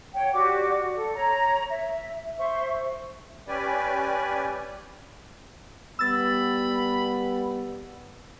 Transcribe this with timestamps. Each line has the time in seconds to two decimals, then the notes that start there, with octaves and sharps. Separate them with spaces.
0.15 C#5 F#5 G5
0.34 F#4 G4 D5 D6
0.96 A4
1.15 C#5 A#5
1.70 E5
2.39 C5 E5 C#6
3.48 C#4 G4 B4 D5 G#5
5.99 G3 B3 B5 E6 A6